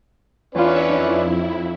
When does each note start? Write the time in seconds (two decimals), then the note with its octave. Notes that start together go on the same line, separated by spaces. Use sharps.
0.55 E2 C#4 D4 F4 B4 C#5 D5 E5
0.89 F2 D#4 E4